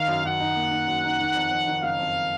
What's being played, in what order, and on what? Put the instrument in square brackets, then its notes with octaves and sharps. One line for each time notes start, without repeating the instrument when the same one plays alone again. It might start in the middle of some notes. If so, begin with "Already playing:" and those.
Already playing: [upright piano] D#3 [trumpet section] F5
[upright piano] F#2
[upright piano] F#2 [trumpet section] F#5
[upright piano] D#4
A#3
D#4
F#2
D#4
D#3
F2
F2
D#3
[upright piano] F#1 [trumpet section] F5
[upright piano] F2